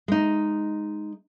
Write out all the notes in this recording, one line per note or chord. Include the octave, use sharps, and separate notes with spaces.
G#3 D#4